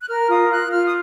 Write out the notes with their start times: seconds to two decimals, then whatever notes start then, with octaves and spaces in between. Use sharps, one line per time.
0.01 F#6
0.08 A#4 F6
0.29 F4 D#6
0.50 F4 F#6
0.71 F4 F6
0.85 D#6